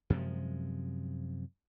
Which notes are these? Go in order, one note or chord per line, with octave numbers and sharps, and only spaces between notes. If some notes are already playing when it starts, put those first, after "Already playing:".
F#2 C3 F3 G#3